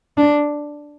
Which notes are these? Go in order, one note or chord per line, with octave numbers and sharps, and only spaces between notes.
D4